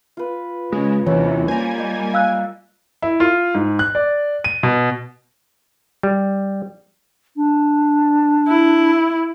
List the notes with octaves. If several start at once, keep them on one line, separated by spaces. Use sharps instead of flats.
F4 B4
C#3 G#3
D#2 C3 E3 C#4 C#5
G3 A#3 C5 G#5 A#5
C5 D#5
F5 E6 F#6
E4
F4
G#2
F#6
D5
D#7
B2
G3
D4
E4